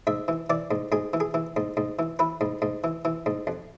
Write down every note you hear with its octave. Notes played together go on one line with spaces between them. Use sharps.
G#2 E5
E3
E3 D5
G#2
G#2 G#4
E3
G#4
E3
G#2
G#2
E3
E3 B4
G#2
G#2
E3
E3
G#2
F2